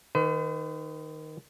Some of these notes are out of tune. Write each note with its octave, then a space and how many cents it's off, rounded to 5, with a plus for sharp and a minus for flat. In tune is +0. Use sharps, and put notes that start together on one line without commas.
D#3 +0 B4 +45